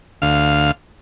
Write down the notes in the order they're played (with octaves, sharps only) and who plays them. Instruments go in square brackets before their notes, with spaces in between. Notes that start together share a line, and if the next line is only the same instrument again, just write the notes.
[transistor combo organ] D2 F5